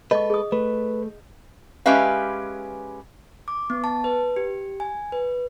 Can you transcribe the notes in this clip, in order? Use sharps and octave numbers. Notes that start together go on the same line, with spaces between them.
G#3 A4 B4 D#5 C#6
G#4 D#6
A3 B4
G#3 C#4 G4 B4 E5 F5
D6
B3
A5
B4
G4
G#5
B4